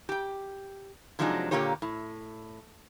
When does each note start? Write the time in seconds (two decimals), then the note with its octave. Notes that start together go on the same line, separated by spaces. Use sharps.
0.09 G4 G5
1.19 C3 F3 F#3 G#3 D4 D#4
1.51 A#2 D3 A#3 F4 G4 C#5
1.82 A2